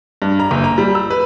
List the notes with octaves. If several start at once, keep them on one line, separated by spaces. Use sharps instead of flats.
G2
A#5
F#1
A#5
G3
E6
B4